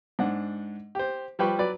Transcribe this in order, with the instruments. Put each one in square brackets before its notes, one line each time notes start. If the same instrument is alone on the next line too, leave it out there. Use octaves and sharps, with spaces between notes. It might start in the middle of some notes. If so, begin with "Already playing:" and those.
[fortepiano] G#2 D4 F#5
G4 C5
F3 G3 B4 G5 C#6
F#3 B4 D5